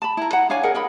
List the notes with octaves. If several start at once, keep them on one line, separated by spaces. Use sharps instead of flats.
A5 B5
E4 A#5
F#5 A#5
D4 C#5 F5 G#5
G#4 A#4 D#5 F#5
A#4 D#5 B5